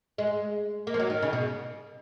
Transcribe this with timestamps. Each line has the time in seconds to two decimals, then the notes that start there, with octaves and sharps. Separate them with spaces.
0.18 G#3
0.87 A#3
0.94 F3
1.00 F#3
1.10 D#3
1.22 C#3
1.33 B2